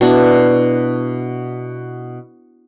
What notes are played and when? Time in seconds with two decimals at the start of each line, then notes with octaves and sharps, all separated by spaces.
0.01 B2 D4 E4